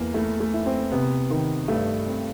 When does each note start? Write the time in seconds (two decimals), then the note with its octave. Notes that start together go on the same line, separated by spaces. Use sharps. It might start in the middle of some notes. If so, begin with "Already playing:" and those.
Already playing: E2 A#3
0.14 A3 E4
0.40 A3
0.53 E4
0.66 C4
0.92 C3 B3
1.30 D#3
1.68 G2 A3
2.07 C4